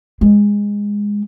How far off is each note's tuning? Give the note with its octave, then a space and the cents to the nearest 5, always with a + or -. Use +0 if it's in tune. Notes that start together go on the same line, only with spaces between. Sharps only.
G#3 -15